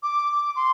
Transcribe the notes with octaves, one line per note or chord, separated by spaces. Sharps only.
D6
C6